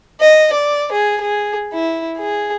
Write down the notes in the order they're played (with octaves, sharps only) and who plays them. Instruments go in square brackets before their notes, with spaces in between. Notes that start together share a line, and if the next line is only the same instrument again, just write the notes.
[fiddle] D#5
D5
G#4
G#4
E4
G#4